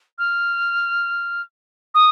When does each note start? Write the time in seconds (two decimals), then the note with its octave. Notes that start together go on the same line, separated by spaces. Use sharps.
0.19 F6
1.95 D#6